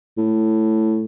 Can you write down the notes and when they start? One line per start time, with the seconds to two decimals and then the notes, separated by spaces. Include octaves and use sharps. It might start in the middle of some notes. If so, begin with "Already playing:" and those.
0.17 A2